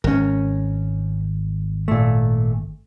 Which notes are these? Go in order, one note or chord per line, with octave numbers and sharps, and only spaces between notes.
G#1 C#4 A#4
A#2 A3